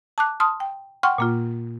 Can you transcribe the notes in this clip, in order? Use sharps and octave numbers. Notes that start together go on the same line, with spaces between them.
A5 D6 F#6
A5 C6 D#6 F6
G5
F#5 G5 C6 C#6 F6
A#2 A#3 F4